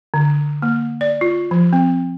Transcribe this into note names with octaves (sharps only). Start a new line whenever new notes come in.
D3
A#3
D5
F4
F3
C4